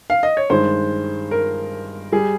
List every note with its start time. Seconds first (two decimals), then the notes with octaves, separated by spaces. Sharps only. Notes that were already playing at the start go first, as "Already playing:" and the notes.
0.10 F5
0.23 D#5
0.37 C#5
0.50 G2 D#3 G#3 C5
1.31 A#4
2.12 G3 G#4